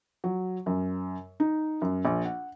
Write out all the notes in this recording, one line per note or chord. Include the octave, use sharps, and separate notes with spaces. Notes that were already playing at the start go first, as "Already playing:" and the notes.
F#3
F#2
D#4
F#2
A#1
F#5